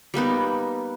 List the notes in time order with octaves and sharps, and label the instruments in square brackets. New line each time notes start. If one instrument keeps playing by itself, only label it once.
[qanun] G3 A#3 B3 D#4